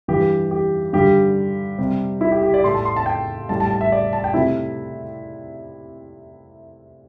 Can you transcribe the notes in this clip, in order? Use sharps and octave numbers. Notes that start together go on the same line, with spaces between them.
G2 E3 G3 G4
G4
G2 D3 G3 G4
C3 G3
E4
G4
G4
D5
A2 A3 C6
A5
C6
A5
G5
A2 G3 A5
A5
A5
E5
D5
A5
G5
C3 A3 E4